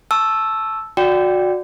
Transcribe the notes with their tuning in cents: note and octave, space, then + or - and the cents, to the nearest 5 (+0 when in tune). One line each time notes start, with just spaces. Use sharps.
A5 -10 C#6 +0 E6 +0
F#4 -25 D5 +0 G5 +0